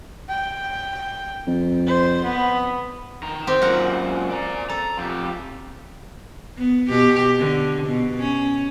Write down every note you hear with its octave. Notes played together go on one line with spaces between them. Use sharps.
G5
F2
C5
B3
D#3 A#5
C4 G4
F#2 A#2 A#4 F#5
D5 A#5
A4 A#5
F2 G4
B3
B2 G4
D3
B2
C#4